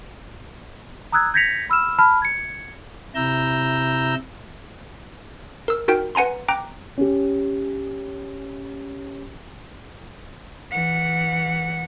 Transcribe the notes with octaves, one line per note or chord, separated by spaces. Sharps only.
A#5 D#6 E6 F#6 G#6
G6 G#6 A#6 B6 C#7 F7
B5 E6 F6 E7
A5 B5 F6
G#6 C#7
C3 E4 A#5 E6 G6
A#4 E6
D#4 F#4 A#4 G5 G6
B4 F#5 G#5 A#5 C6
G5 A#5 D6 F#6
C#4 G4
E3 F#5